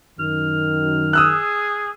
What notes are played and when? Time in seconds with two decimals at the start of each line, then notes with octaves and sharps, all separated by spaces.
0.19 F#2 D#3 F6
1.13 G#4 D#6 E6 F#6